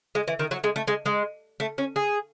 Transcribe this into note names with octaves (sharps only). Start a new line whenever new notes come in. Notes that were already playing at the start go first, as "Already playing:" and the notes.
G#3
E3
D#3
F#3
G#3
A3
G#3
G#3
A3
C#4
G#4